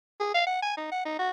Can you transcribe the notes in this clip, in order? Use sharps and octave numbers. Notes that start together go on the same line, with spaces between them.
G#4
F5
F#5
G#5
D#4
F#5
D#4
F#4